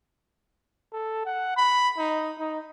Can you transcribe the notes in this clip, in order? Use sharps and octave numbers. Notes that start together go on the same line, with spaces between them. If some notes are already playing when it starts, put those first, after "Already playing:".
A4
F#5
B5
D#4
D#4